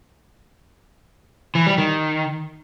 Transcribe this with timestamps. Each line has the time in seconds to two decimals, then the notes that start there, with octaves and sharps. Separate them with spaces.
1.55 E3
1.66 G3
1.78 D#3